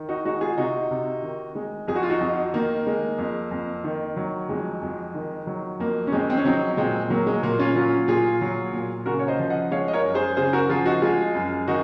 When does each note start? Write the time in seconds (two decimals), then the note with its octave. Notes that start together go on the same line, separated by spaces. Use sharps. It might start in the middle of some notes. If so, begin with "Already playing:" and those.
Already playing: D#3
0.09 D#4 F#4
0.25 G#3 D#4 F#4
0.41 F4 G#4
0.58 C3 D#4 F#4
0.91 C3
1.23 D#3
1.55 G#3
1.88 F2 G#4
1.96 F#4
2.03 F4
2.10 D#4 F#4
2.21 F2
2.54 D#3 A#3
2.87 G#3
3.18 F2
3.51 F2
3.84 D#3
4.16 F#3
4.49 F2 G#3
4.82 F2
5.14 D#3
5.47 F#3
5.80 F2 A#3
6.07 C#4
6.12 F2 G#3 C4
6.30 C4
6.37 C#4
6.45 F#3 C4 D#4
6.77 A#2 G#3 C4
7.10 F#3 A#3
7.26 G#3
7.43 A#2 A#3
7.59 C#4 F4
7.75 F#3 C#4 F4
8.08 A#2 F4 G#4
8.41 F#3
8.73 A#2
9.06 C#3 F#4 A#4
9.19 C#5
9.28 C5 D#5
9.39 F3
9.50 D#5 F#5
9.71 G#3 C#5 F5
9.88 D#5
9.93 A#4 C#5
10.04 F#2
10.15 G#4 C5
10.37 C#3 G#4 C5
10.53 F#4 A#4
10.69 F3 F4 G#4
10.86 D#4 F#4
11.02 G#3 F4 G#4
11.35 F#2
11.67 D#3 D#4 F#4